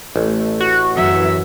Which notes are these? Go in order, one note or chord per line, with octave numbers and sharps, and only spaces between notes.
A1 A3
F#4
F#2 E3 F#3 E5